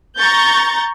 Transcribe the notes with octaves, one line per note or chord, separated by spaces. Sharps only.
A#5 C#6 G6 A6